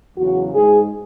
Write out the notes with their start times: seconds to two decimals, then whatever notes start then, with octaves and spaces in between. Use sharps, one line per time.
0.18 E2 C#3 F#3 F#4
0.53 G#2 G#3 G#4